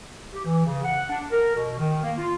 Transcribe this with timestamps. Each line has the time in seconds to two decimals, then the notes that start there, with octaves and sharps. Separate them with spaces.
0.34 G4
0.45 E3
0.65 C#3
0.84 F#5
1.09 D4
1.31 A#4
1.56 B2
1.79 D#3
2.03 A#3
2.18 F4